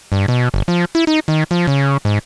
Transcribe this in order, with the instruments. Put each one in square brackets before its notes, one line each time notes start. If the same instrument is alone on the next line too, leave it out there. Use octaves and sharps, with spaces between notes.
[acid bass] G2
B2
G1
F3
E4
D#4
D#3
F3
C#3
G#2